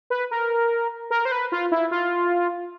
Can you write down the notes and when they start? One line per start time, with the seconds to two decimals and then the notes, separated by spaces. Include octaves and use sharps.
0.10 B4
0.31 A#4
1.11 A#4
1.25 C5
1.32 B4
1.52 F4
1.72 E4
1.91 F4